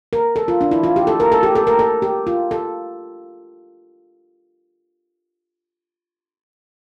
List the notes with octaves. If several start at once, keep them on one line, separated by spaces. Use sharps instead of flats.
A#4
A4
F4
D4
E4
F4
G4
A4
A#4
A4
G4
A4
A#4
A4
G4
F4
A4